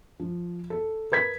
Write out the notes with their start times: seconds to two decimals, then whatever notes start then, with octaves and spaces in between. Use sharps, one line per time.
0.20 F3
0.70 A4
1.12 A#4 B4 G#6 B6